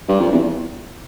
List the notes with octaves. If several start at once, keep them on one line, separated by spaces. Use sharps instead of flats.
G2
F2
E2